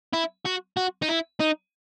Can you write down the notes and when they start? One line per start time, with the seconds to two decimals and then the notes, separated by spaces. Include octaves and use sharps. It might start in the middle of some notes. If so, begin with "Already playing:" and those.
0.13 E4
0.45 F#4
0.77 F#4
1.02 D#4
1.09 E4
1.40 D#4